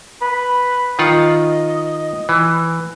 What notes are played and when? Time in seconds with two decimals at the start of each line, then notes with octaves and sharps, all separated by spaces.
0.21 B4
0.99 D#3 F4 D#5 F#5
2.29 E3